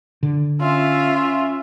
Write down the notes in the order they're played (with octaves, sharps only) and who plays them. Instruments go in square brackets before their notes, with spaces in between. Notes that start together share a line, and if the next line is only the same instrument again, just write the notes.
[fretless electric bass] D3
[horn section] C#4 E5 [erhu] F4